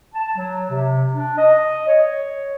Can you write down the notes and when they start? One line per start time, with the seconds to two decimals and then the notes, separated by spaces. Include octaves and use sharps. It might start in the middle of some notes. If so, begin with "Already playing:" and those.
0.14 A5
0.36 F#3
0.69 C3
1.14 D4
1.38 D#5
1.87 C#5